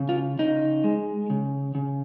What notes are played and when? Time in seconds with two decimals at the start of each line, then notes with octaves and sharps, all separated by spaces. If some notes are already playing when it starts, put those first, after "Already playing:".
Already playing: C#3
0.09 F4
0.39 C#3 D#4
0.84 G#3
1.30 C#3
1.75 C#3